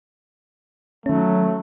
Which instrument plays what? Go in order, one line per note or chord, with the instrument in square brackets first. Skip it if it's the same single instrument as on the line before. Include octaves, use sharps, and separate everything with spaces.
[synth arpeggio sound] D#3 C#4 [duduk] F#3 [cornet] A3